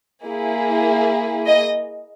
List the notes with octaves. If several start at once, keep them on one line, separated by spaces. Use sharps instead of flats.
A#3 E4 G#4
D#5